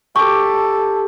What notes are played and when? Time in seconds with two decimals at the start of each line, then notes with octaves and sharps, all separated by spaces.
0.16 G4 A4 C#6 D6